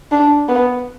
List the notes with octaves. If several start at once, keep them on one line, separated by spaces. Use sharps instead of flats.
D4
B3